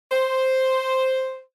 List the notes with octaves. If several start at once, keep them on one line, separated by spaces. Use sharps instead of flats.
C5